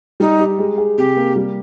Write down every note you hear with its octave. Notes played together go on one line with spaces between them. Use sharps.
G3 D#4
G4
G#3
G#4
C3 G4
A#3
G3